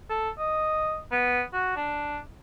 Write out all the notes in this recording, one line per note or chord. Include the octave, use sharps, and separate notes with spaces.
A4
D#5
B3
F#4
D4